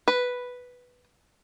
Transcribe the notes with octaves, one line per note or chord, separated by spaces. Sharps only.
B4